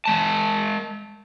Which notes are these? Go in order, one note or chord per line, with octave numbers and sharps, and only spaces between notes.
G#3 A5